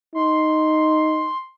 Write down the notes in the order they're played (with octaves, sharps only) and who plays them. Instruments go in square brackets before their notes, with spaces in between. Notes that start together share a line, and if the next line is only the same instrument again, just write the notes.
[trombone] D#4 [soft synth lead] C6